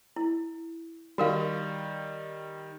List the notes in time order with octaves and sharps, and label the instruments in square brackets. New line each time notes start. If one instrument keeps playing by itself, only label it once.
[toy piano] E4
[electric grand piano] D#3 G3 [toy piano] F#4 A#4 F5